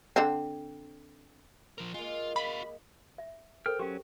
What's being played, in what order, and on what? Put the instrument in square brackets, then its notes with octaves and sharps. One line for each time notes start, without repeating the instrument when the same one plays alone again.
[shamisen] D3 C4
[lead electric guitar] F3 A#4
[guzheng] G#3 A#3 [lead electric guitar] F4
[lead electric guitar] F#4 F5 [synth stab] B5
[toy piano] E5
[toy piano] A4 A#4 C5 [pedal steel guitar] G5 F6
[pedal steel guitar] F#3 C#4 [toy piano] G4 G5 C#6